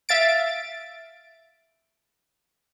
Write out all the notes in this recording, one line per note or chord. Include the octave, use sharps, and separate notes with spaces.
E5 F5 A6 D7